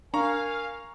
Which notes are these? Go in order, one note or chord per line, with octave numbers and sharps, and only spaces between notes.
D4 A#4 F5 G#5 A#5 C#6